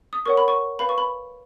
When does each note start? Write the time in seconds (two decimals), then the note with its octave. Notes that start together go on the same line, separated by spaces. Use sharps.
0.13 D#6
0.26 A#4 C#5 F#5 C#6
0.37 B5
0.48 C#6
0.79 B4 F5 B5
0.89 C#6
0.98 B5